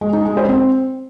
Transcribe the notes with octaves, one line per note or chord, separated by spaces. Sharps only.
G#3
D#4
G#3
C5
C4